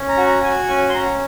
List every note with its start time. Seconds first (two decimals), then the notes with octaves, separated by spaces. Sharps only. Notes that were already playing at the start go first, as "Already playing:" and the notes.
Already playing: C#4
0.09 A#5
0.17 F#4
0.26 A#5
0.43 F#4 G#5
0.69 C#4
0.89 C6
0.94 C#4 A#5